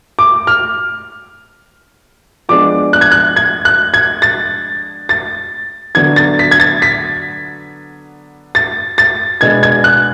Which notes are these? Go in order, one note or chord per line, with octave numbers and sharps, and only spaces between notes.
D6
F6
F3 G#3 B3 D4 D6
F#6
G#6
F#6
G#6
F#6
G#6
A6
A6
D3 F#3 B3 D4 G#6
A6
B6
G#6
A6
B6
A6
A6
B2 G#3 B3 D4 G#6
G#6
F#6